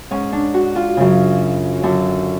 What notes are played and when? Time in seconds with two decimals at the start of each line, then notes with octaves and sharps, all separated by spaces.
0.11 G#2 C#4
0.32 D4
0.54 F#4
0.76 F4
0.97 F#2 C#3
1.83 F#2 D3 D4